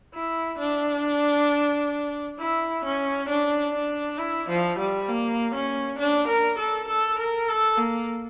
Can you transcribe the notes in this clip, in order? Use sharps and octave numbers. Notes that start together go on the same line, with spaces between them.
E4
D4
E4
C#4
D4
D4
E4
F3
G3
A#3
C#4
D4
A#4
A4
A4
A#4
A4
A#3